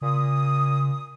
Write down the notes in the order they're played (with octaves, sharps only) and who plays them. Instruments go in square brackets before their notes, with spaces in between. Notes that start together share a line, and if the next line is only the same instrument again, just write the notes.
[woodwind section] A#2 D#6 [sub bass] C#3